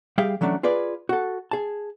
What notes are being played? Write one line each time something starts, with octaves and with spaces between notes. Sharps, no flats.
G3 G#4 E5 F5 G5
E3 F#3 A3 C#4 D4
F4 G#4 B4 D5
F#4 A4
G#4 A5